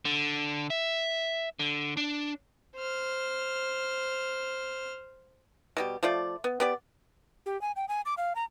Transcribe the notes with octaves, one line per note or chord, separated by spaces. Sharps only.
D3
E5
D3
D4
C5 F6
B2 G3 G4
F3 A3 F4 D5
B3
B3 G4 D5
G4
G#5
G5
G#5
D6
F5
A#5